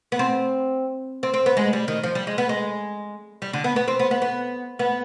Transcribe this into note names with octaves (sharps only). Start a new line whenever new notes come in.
B3
C4
C4
C4
B3
G#3
G3
D#3
F3
G3
G#3
B3
G#3
G3
D3
B3
B3
C4
B3
B3
B3
B3